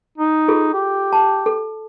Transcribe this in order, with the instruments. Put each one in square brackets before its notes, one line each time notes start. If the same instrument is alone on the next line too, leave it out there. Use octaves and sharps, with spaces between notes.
[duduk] D#4
[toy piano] F4 G#4 A4
[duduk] G4
[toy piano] A5
A4